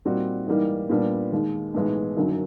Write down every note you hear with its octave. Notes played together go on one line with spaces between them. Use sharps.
A#2 G3 C4 D#4 F#4
G#2 E3 G3 A#3 D#4
A#2 G3 B3 D4
D#2 D#3 G#3
B1 A2 E3 G#3 B3
G1 F#2 D#3 F#3